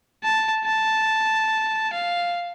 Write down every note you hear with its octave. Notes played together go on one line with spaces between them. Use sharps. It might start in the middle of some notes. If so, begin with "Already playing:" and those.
A5
A5
F5